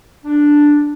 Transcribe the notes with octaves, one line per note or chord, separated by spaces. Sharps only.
D4